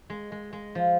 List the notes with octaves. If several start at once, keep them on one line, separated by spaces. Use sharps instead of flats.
G#3
G#3
G#3
F3